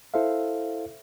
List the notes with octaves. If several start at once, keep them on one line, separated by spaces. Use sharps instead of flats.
E4 A4 C5 E5 F5